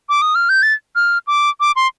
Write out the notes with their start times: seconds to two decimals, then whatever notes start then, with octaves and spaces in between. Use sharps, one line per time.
0.09 D6
0.22 D#6
0.35 F6
0.49 G6
0.62 A6
0.96 F6
1.27 D6
1.60 D6
1.76 C6